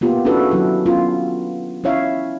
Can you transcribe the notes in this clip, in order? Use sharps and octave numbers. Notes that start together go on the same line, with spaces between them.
A#3 B3 F4 G4
C#4 D4 E4 F#4 A4 B4
D#3 F#3 E4 A4
B3 C#4 F4
C#4 E4 C#5 E5 F5